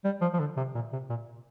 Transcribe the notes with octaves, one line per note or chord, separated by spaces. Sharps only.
G3
F3
F3
D3
C3
A#2
C3
A#2